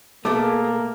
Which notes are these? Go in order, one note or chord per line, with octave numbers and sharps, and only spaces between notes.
B2 A3 A#3 G#4 E5 A5 D6